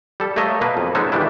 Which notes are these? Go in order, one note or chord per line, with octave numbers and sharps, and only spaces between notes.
G3 A4
A3 A#3 C#5 D#5 E5
B2 A#3 B4
F2
G#3 A3 B3 C#4 D#4 E5
D#3 E3 G3 D4 E4